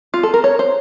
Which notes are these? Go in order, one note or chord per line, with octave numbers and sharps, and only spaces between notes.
F4
A4
A#4
C#5
C5